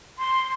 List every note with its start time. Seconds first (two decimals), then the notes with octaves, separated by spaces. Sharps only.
0.18 C6